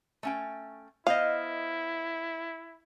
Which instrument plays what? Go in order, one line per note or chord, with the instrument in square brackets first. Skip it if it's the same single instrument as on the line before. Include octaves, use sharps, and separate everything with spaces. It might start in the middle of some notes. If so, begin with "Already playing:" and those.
[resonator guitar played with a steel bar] A3 C#4 G5
[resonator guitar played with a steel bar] B3 C5 D#5 [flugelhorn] E4 [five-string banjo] F5